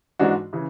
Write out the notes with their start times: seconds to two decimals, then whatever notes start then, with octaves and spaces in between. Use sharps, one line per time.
0.19 G#2 E3 G#3 D4 F#4
0.53 C#3 E3